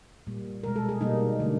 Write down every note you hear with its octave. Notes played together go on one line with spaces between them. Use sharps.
A#2 G3 A#3
B2 G#3 A#4
A4
G#4
B2 G3 A#3 D#4
D3 F#3 A3